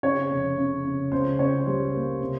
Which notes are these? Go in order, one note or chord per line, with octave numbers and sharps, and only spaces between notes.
C#3 C#5
F1
C#3
C#3
C#2 C5
C#2 C#5
G3 C5
A#3
C3